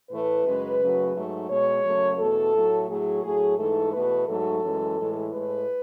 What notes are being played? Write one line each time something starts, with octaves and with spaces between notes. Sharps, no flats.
A2 E3 A3 B4
F#2 C#3 G#3
F#2 C#3 F#3 A3
G#2 F#3 A3
B2 G#3 C#5
F#2 C#3 F#3 A3
E2 B2 A3 A4
A2 F#3 A3
A2 F#3 A3 G#4
A2 F#3 A3 G#4
G#2 E3 A3 A4
E2 B2 A3 B4
G#2 F#3 A3 A4
F#2 E3 G#3
A2 E3 G#3
A2 G#3 B4